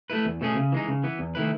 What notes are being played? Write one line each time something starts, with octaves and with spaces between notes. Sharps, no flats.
A3 E4 B4
E2
B2 A3 C#4 G#4
C#3
E3 G#3 D#4
C#3
E3 B3
E2
D#3 A3 E4 B4